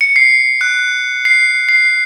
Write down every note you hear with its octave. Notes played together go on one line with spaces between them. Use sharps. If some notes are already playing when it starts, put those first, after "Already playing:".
C#7
C7
F#6
C7
C7